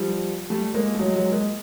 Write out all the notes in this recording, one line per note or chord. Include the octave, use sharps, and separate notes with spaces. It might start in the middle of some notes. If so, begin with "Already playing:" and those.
Already playing: F3 G3
G3 A3
G#3 A#3
A3
F#3 G#3
F#3 G#3
G#3 A#3